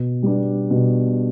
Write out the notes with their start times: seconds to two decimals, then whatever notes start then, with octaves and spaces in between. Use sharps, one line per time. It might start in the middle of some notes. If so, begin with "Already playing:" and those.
Already playing: B2
0.23 G3 B3 D4
0.70 B2